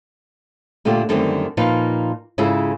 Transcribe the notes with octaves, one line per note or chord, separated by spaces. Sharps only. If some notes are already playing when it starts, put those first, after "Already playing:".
A#2 D3 A3 F4 G4
F#2 D3 D#3 G3 A3 C4
A#2 F3 D#4 B4 F5
G#2 C#3 E4 F4 G#4 A4